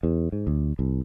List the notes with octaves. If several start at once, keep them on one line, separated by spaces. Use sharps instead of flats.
E2
G#2
D2
C2